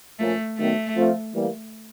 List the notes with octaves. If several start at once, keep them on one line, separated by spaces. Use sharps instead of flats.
A#2 F3 A3 A#3 C#4
D#3 F#3 A3 B3
F3 A3 C4 F4
E3 G3 A#3